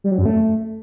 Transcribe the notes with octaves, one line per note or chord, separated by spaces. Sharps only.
G3
F#3
F#2
A3